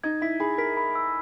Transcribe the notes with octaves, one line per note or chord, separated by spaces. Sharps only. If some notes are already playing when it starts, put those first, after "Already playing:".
D#4 G#6
E4 B6
G#4 B5
A#4 B6
B5
E6